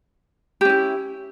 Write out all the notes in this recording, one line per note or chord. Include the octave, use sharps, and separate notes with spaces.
C#4 E4 G4